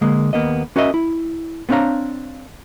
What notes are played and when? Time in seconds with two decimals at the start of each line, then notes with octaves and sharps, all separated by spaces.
0.01 D3 G#3 A#3
0.33 D#2 A#3 B3 D#5
0.76 C#4 F#4 A#4 C#5 D#5 E5
0.94 E4
1.69 B3 C4 D4 C#5 F5 A#5